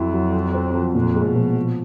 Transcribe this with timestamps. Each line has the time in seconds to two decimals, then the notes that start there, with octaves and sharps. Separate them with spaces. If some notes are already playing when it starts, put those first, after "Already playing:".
Already playing: F2 F#3 E4
0.14 F#3
0.34 F3
0.54 C4
0.75 F3
0.95 F2 A#2
1.16 G#3
1.25 B2
1.36 F3
1.56 F3